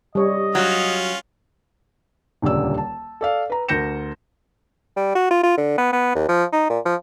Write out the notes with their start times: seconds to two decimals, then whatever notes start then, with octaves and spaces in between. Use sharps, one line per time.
0.15 G3 C#5 D#5
0.55 F#3 C#4 F4
2.42 D#1 C#2 D3 G3 D5 E6
2.78 A5
3.21 A4 D5 F5
3.50 B4 A#5
3.69 D2 A#4 G6 A#6 C#7 E7
4.97 G3
5.15 F#4
5.31 F4
5.43 F4
5.57 D3
5.78 B3
5.93 B3
6.15 D#2
6.29 F3
6.53 D#4
6.70 A#2
6.85 F3